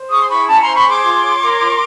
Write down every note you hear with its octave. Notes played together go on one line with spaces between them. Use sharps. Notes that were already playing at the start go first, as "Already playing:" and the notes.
Already playing: C5
G#4 C#6 D#6
C6
E4 B5 C#6
C#4 A5 B5
C5 A#5 C6
B5 C#6
G#4 C6 D6
F4
C#5
A#4
F4